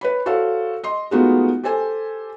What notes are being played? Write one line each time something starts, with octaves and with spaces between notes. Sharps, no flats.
B4 C#5 B5
F#4 A4 C5 C#5 F5
D#5 C6
G#3 A3 B3 D#4 F4 F#4
G4 A4 C5 G#5